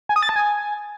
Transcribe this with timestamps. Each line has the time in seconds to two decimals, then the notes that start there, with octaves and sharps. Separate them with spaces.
0.09 G#5
0.16 D#6
0.23 A6
0.29 A5
0.36 G#5